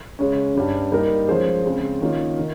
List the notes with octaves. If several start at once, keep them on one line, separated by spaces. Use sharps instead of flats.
C#3 G#3 C#4
G2 G3 C#4
G3 A#3 D#4 A#4
F3 G#3 C#4 G#4 C5
C#3 G#3 C4
D#3 A#3 C#4 F4
D#3